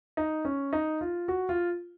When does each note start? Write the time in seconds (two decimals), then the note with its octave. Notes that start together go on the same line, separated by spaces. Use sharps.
0.17 D#4
0.45 C#4
0.73 D#4
1.01 F4
1.28 F#4
1.49 F4